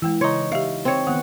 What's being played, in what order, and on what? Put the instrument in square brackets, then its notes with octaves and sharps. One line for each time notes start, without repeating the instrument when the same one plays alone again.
[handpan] E3 [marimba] G#3 G5 E6
[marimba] C#3 C6 [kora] D#4 C#5
[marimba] G4 E5 [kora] F5
[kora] C4 C#5
[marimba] D#3 [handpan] B3 F#5